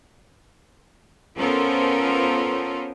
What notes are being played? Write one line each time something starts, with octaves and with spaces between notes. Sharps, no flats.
B3 C#4 F4 A4 A#4 C5